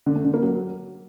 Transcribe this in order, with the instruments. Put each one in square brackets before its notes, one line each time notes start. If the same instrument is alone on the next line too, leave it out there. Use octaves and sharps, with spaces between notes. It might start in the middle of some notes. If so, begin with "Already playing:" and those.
[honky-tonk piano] D3
A3
D3
A#3
F#3